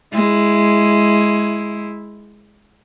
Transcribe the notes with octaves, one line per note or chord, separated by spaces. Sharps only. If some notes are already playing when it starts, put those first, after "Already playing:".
G#3 E4